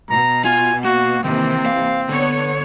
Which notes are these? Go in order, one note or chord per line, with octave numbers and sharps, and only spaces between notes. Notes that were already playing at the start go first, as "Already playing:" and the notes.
B2 A#5
F4 G#5
A#3 F#4
C3 D#3 E3 A#3 C4
F5
D3 B3 C#5